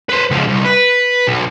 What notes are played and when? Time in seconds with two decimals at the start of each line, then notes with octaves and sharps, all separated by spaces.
0.09 B4 C5
0.30 C#2 F3
0.47 C2
0.65 B4
1.27 B1